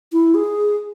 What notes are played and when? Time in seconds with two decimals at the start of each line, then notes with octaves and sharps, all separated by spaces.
0.13 E4
0.35 G#4